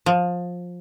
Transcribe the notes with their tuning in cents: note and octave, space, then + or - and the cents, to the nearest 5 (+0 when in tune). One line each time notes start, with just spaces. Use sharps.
F3 +20